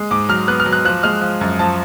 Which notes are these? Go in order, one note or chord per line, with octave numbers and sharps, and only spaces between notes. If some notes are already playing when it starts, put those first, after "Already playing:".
Already playing: G#3
G#2 D6
F#3 F6
B3 F#6
F6
F#3
F#6
F3 F#6
G#3 F6
F3
F#2
F3 A5